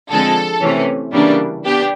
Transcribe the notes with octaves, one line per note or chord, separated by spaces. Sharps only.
D3 F3 G#3 C4 A4
C3 E3 A3 C#4
C#3 E3 G3 A#3 D4
B3 D4 G4